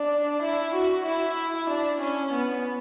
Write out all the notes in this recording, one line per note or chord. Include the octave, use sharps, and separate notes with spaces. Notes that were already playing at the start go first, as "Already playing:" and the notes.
Already playing: D4
E4
F#4
E4
D4
C#4
B3